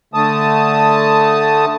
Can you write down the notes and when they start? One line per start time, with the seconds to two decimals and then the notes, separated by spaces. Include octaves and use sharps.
0.14 D3 A3 A5 D#6